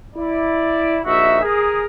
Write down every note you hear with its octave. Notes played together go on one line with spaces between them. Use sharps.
E4 D5
A#1 D#4 F#4 E5
G#4 A#4